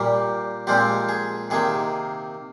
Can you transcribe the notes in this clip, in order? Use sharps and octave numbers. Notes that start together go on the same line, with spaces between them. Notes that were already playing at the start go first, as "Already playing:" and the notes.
Already playing: A#2 G3 A#3 G4
A#2 F3 G#3 C4 F4 G4
G#4
C3 D#3 A#3 G#4